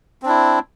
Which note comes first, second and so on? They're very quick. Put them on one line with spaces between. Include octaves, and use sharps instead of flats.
C4 D4 E4